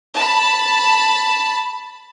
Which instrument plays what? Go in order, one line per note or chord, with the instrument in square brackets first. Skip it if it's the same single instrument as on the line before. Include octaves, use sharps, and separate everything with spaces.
[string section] A5 B5